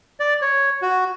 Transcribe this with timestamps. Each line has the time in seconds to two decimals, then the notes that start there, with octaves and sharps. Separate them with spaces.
0.20 D5
0.42 C#5
0.82 F#4